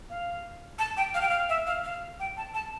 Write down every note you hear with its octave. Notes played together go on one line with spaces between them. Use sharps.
F5
A5
G5
F5
G5
F5
E5
F5
F5
G5
A5
A5